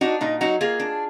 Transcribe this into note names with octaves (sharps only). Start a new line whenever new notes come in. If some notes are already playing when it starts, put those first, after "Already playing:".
D4 D#4 F#4
A#2 D#4
F#3 D#4 F#4
A#3 F4 G#4
D4